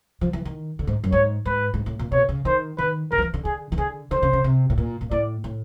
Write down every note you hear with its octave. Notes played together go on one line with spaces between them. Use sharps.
F3
E3
D#3
D3
G#2
F#2
G#2 C#5
G#2 B4
G#2
A2
A#2
B2 C#5
C#3
D#3 C5
D#3 B4
D#3 A#4
F3
E3
D3
D3 G#4
D#3
D3 G#4
D3 C5
C#3
C#3
C3
A2
A#2
A#2
A2 D5
A2